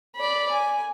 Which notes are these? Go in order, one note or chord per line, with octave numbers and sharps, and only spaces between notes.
D5 B5
G#5